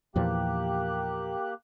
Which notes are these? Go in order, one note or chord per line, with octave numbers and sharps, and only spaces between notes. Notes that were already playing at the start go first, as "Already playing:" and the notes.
E2 A#2 F3 A#3 G4 F#6